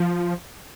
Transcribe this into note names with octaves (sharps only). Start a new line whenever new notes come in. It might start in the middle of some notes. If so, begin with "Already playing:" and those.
Already playing: F3